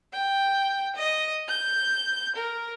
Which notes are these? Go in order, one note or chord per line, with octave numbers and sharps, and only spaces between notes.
G5
D#5
G6
A#4